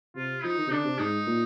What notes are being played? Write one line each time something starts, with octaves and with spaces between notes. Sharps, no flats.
C3 F4
F3 D#4
D#3
C3
D3 D4
C3
G#2 D#4
A#2